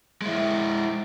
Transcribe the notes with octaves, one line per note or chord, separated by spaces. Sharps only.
G#3 E4